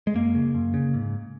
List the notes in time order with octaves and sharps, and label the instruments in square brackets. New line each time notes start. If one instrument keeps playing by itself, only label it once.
[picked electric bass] G#3
F#2 A#3
C#3
F#2
C#3
G#2